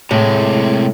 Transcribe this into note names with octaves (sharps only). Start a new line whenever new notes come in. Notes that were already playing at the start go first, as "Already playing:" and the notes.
A2 C3 G#3